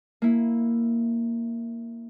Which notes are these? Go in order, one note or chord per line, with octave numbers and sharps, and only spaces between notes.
A#3 E4